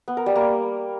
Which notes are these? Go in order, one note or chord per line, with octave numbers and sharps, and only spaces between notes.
B3
A#4
G3
A#3